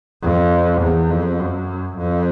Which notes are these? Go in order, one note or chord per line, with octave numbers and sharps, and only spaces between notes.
F2
E2
F2
F#2
F2